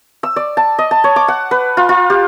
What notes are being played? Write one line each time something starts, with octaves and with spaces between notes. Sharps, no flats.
E6
D5
A5
D#5
A5
C#5
D6
F#5
B4
F4
F4
G4